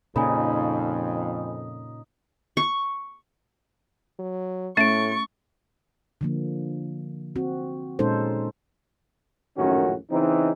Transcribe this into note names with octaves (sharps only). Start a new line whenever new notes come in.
F2 A#2 C#3 D#4 G#5 B5
C#6
F#3
A2 A3 C#4 E5 C#6 A6 D7
D3 F3 A#3
C4 F#4
A#2 G#3 C#4 D#4 A4 C5
A#1 F#2 A2 D#3 C#4 F#4
C#3 E3 C4 D#4